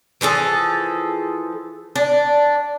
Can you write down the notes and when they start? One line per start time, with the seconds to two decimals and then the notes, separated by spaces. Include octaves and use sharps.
0.21 E3 F3 G#4 A4
1.96 D4